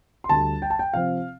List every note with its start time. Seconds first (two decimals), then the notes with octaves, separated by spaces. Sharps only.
0.24 C6
0.29 D2 D3 G3 D4 A5
0.62 G5
0.70 A5
0.79 G5
0.94 C3 F3 C4 F5